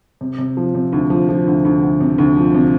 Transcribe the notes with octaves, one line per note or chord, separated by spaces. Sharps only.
C3
C3
F3
C3
D2
F3
F3
D2
D2
D2
C3
D2
F3
C3